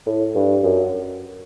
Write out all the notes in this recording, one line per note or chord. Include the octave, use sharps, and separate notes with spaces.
A2
G2
F#2